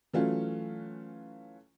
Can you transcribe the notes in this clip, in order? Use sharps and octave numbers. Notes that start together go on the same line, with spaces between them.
E3 F#3 A3 C#4 F4